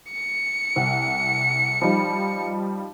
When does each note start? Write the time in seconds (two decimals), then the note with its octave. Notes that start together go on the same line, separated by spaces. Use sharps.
0.12 C#7
0.76 C2 F#5
1.82 F3 G3 D#4